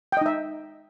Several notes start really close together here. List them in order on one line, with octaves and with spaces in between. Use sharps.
G5 D#5 D#4 E5